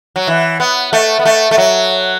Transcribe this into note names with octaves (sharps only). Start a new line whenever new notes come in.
F#3
E3
B3
A3
B3
A3
A3
F#3